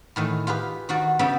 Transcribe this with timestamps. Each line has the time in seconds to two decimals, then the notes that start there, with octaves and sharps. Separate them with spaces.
0.16 A2 D#3 E3
0.47 F4 G4 G#4 B4
0.89 D#3 F#4 D5
1.19 C#3 B3 F#4 D5 E5 G5